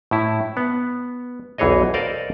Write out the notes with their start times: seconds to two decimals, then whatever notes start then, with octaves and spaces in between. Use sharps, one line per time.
0.11 A2 E4
0.57 B3
1.58 B1 E2 E3 G#4 C#5 D#5
1.94 A4 A#4 C5 D5 D#5 F5